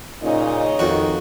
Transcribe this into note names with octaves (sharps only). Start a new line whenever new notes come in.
A#2 C#3 C#4 D#4 D#5
F2 D#3 F#4